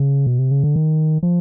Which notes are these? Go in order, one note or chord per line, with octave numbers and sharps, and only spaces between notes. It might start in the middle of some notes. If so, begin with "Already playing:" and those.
Already playing: C#3
B2
C3
C#3
D3
D#3
F3